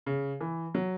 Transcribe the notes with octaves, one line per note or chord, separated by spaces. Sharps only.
C#3
E3
F#3